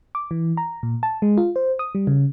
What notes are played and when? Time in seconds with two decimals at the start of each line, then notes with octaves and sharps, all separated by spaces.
0.15 D6
0.31 E3
0.57 A#5
0.83 A#2
1.03 A5
1.22 G#3
1.37 F4
1.56 C5
1.79 D#6
1.95 G3
2.07 C#3